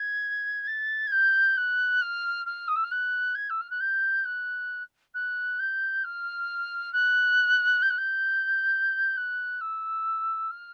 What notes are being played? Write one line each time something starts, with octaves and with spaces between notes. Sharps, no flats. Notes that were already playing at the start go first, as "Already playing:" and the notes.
Already playing: G#6
A6
G#6
G6
F#6
F6
F6
D#6
E6
F6
F#6
G#6
E6
F6
F#6
G6
F#6
F#6
G6
F6
F#6
G6
F#6
G6
F#6
E6
F6